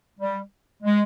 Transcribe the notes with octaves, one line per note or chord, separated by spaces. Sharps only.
G3
G#3